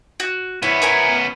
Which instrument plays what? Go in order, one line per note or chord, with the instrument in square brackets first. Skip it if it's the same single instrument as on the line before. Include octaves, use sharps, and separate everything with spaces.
[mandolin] F#4
[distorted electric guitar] B3 C#4 [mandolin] E4
[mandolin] E4 A#4 G#5